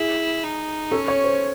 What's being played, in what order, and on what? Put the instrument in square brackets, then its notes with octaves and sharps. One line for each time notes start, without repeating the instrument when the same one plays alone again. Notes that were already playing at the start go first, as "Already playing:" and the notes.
Already playing: [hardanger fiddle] E4 [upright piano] G#4
[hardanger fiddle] D#4
[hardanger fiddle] C#4 [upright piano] A4
[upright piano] C#5
C5